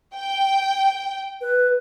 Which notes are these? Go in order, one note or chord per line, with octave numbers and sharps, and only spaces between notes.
G5
B4